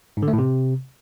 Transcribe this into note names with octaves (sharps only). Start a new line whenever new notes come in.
G#2
D3
A3
A2
C3